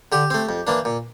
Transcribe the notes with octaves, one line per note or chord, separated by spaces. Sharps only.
D3 G4
A3 C4
F2
E3 A#3 D4
A#2